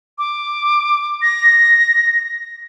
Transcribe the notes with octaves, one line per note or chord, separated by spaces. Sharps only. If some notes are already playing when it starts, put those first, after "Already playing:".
D6
A#6